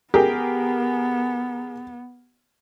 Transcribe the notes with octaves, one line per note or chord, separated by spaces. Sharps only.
B3 G4 G#4 A#4